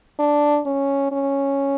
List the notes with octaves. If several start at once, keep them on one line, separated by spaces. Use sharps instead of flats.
D4
C#4
C#4